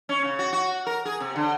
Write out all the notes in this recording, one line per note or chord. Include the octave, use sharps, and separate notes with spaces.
C#4
C#3
F#4
F#4
A#4
G#4
C3
D3